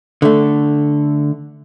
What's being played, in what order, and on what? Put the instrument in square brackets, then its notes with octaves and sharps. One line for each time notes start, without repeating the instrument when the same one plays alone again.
[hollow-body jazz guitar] D3 A3